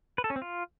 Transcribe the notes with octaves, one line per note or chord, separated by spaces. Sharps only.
B4
A4
C#4
C4
F4